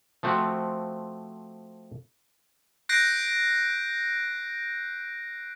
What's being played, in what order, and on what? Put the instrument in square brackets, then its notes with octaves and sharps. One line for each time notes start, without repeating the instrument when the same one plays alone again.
[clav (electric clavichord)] F3 A3 C4 F#4
[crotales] F#6 G6 A#6 C7 D7